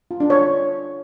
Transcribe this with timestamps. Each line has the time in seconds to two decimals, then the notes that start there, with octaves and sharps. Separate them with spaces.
0.11 F4
0.20 D4
0.30 C#5